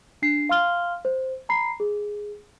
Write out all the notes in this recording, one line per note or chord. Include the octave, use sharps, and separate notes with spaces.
D4 C7
F5 C6 F6 G7
C5
A#5 B5 C7
G#4